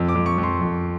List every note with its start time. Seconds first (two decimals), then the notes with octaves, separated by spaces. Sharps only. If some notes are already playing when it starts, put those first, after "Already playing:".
Already playing: F2
0.09 D6
0.15 F2
0.26 C#6
0.38 F2
0.43 C6
0.61 F2